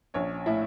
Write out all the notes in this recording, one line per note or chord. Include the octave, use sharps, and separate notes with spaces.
A#1 C#4 C#5
A2 E4 E5